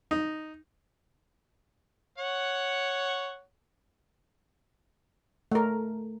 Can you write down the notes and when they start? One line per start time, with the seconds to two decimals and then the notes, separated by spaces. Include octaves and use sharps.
0.11 D#4
2.18 C#5 F#5
5.52 A3 A#4